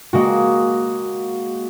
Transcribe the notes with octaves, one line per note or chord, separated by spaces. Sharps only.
G#3 A#3 F#4